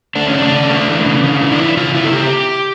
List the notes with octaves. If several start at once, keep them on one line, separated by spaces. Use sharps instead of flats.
A3 D4
C#4
C#3 D4
C#3
A3
E3
C#3
C#3
E3
D4
C#3 E4
C#3 F4
C#3 E4
A4
C#3 G4